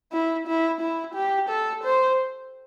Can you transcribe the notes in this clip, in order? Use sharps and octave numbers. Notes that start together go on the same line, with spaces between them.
E4
E4
E4
G4
A4
C5